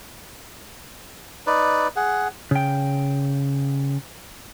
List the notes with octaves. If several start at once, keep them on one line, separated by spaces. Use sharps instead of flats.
D#4 B4 D5
G#4 F#5
C#3 G5